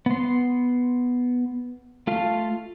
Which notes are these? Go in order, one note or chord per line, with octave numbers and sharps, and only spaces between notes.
B3 C6
A3 F4 A4 F5